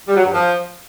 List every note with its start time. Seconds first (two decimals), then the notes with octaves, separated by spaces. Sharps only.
0.08 G3
0.17 F#3
0.25 G2
0.34 F3